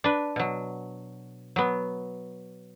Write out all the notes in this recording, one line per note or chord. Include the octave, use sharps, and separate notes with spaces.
D4 B4
B2 F#3
F#3 B3